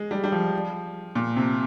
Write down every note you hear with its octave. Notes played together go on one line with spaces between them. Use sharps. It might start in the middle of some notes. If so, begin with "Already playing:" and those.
Already playing: G#3
G3
G3
F3
A#2
C3